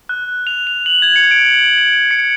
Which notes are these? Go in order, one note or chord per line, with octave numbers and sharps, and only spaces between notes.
F#6
F7
F7
F#7
G#6
C#7
D7
D7
C#7